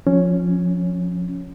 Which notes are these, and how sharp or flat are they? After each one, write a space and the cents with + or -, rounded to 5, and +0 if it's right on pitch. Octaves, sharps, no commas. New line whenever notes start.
F3 +20 C#4 +0